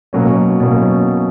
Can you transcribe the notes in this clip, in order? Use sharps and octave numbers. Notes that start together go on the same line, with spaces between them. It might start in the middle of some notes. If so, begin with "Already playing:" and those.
B2 F#3 A#3 C#4
B2 F#3 A#3 C#4